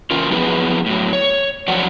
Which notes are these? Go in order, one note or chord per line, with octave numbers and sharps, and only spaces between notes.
C#3 E3 C#4 F4 A#4
F3 F#3 B3 E4 G#4 B4
A2 F#3
C#5
F#2 F3 F#3 D5 F#5